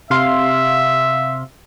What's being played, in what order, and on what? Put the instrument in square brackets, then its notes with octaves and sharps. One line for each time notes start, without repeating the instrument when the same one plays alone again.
[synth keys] C3 F5 C6 [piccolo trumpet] E5